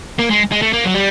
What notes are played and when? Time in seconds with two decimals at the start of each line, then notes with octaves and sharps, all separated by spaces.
0.19 A#3
0.31 G#3
0.52 G#3
0.62 A3
0.73 A#3
0.84 F#3
0.94 G3